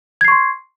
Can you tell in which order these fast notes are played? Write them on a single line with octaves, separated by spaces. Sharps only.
G#6 C7 C#6 C6